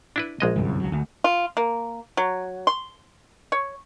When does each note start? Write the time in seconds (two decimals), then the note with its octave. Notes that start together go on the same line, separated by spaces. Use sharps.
0.16 D4 E4 B4
0.40 A#1 G#3 D#5
0.56 G1 C2 F#2
0.80 C#2 F#3
0.92 D2
1.24 F4
1.57 A#3
2.17 F#3
2.67 C6
3.52 C#5